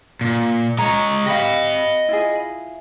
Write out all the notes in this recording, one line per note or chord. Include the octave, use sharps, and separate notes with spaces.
A#2
G#3 C#5 A#5
G4 D#5 F5 B5
E4 F4 G#4